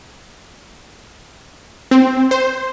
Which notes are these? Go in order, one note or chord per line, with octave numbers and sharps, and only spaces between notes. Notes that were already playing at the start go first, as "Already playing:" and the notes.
C4
C5